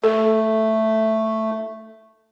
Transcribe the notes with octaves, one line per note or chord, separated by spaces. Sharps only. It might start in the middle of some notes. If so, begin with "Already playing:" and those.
A3 A4